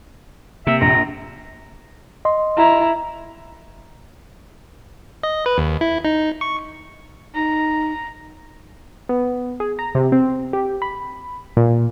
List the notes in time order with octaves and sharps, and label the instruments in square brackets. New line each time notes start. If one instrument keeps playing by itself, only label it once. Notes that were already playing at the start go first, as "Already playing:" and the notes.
[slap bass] C3 [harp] A#3 [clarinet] E5
[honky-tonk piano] A#1 [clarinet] A#5
[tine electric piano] D#5 C6
[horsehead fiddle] E4 A#5
[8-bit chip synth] D#5
B4
D#2
E4
D#4
C#6
[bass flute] D#4 [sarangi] A#5
[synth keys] B3
G#4
A#5
C3
C4
G4
B5
A#2